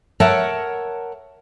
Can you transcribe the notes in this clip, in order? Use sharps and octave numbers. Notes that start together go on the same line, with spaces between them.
A#4 C#5 E5 F#5 A5